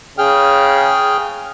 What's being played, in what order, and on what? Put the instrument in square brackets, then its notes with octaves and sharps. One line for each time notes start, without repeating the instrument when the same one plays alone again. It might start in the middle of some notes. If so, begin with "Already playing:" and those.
[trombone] C#3 [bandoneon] G#4 G5 F6